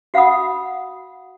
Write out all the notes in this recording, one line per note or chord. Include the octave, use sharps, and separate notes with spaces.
F#4 F5 F#5 B5 D#6